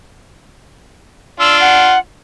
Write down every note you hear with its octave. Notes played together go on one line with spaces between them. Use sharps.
D4 F4 E6
F#5